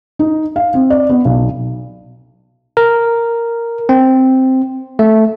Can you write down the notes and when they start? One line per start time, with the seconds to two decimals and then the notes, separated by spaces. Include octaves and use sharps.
0.19 D#4
0.56 F5
0.74 C4
0.90 D5
1.09 B3
1.25 B1
2.77 A#4
3.89 C4
4.99 A3